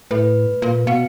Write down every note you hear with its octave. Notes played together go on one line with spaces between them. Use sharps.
A2 B4
A#2
B2 F5 C#7